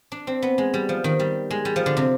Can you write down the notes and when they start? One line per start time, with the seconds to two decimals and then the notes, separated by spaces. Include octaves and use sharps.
0.12 D4
0.27 C4
0.42 B3
0.58 G#3
0.74 G3
0.89 F3
1.04 D#3
1.19 G3
1.51 G#3
1.65 G3
1.76 F3
1.86 D3
1.97 C3